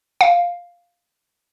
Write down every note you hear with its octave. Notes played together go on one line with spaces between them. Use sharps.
F5